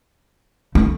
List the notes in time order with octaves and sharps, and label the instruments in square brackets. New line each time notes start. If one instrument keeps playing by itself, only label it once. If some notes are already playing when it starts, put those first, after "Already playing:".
[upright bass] A3